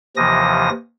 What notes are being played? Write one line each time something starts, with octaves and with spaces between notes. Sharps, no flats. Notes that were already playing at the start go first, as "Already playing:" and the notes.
D#2 C3 E3 F3 D#6 A#6